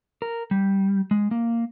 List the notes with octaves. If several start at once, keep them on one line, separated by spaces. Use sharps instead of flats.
A#4
G3
G#3
A#3